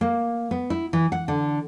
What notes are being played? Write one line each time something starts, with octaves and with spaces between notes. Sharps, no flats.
A#3
B3
E4
E3
F#5
D3